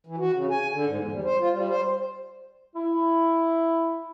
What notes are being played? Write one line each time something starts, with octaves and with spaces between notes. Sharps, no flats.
E3
F#4
C#3
G#5
D3
G#2
E2
G3
C5
F4
G3
C5
E4